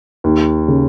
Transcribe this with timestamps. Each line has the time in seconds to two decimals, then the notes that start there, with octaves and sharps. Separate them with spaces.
0.24 D#2
0.68 C#3